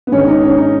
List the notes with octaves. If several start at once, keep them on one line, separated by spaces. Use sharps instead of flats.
B3
G#2 D#3 C#4
D#4
C#4
D#4